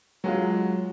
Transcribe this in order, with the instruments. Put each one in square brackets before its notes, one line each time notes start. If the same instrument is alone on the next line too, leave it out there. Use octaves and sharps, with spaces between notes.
[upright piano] F#3 G#3 F4